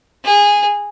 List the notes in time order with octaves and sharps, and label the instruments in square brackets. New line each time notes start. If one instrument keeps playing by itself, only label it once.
[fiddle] G#4